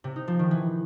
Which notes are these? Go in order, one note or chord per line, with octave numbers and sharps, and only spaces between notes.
C3
D#4
F3
D#3
E3